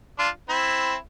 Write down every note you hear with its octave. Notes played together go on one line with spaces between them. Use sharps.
D4 F4
C4 E4